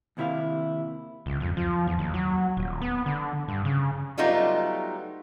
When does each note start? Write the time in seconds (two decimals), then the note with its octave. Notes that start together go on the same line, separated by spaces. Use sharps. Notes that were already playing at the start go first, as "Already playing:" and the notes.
0.17 D#2 C3 E4 E5 F5
1.26 C#2
1.40 F2
1.57 F3
1.87 E2
1.99 D#2
2.14 F#3
2.57 D#1
2.81 B3
3.06 D3
3.48 G2
3.65 C#3
4.18 F#3 G3 A3 B3 D#4 F4